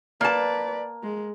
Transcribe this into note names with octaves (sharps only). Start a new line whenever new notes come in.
A#3 B4 D5 A5
G#3